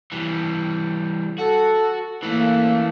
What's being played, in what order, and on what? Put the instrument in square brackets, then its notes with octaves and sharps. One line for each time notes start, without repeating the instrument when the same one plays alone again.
[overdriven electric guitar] E3 G3
[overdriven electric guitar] F#4 [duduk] A4
[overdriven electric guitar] E3 A3 [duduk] A#3